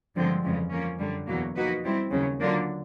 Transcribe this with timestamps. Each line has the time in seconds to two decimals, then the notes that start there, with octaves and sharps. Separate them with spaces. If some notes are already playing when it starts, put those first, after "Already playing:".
0.15 G2 D3 F3 G#3 C4
0.43 F2 C#3 E3 G#3
0.71 F3 A#3 C#4
0.99 F#2 D3 G3
1.27 E2 B2 F#3 A#3
1.55 F3 A#3 D#4 F#4 B4
1.83 G3 C4 E4
2.11 D#2 C#3 F#3
2.40 D3 F#3 A#3 D4 F4